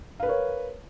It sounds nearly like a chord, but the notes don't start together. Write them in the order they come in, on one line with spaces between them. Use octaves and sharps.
F5 B4 A#4 C#5